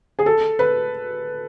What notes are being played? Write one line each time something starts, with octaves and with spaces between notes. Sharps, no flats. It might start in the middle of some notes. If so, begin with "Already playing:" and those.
G#4
A4
B4